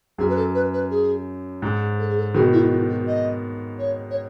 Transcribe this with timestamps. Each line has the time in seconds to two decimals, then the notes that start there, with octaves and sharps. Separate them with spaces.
0.18 F#2 G#4
0.29 B4
0.36 A4
0.54 B4
0.73 B4
0.90 G#4
1.62 G#2 G#4
1.99 A4
2.08 G#4
2.17 A4
2.34 B2 D#3 G#4
2.52 E4
2.70 E4
2.89 F#4
3.06 D#5
3.78 C#5
4.10 C#5